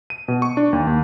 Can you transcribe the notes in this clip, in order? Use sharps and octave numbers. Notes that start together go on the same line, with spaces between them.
D#7
B2
C#6
D4
D#2
D#2